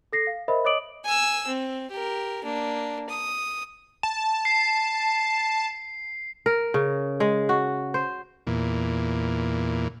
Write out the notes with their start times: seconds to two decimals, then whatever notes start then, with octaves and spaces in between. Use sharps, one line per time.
0.13 A4 A#6 C7
0.27 F5
0.48 A#4 C5 D#5 E5 B5
0.65 C#5 D#5 D6 D#6 D7 F#7
1.05 G#5 E6
1.47 C4
1.91 G4 A#4
2.44 A#3 D4
3.09 D#6
4.03 A5
4.45 C7
6.46 A#4
6.74 C#3
7.20 G#3
7.49 F#4
7.94 C5
8.47 E2 A#2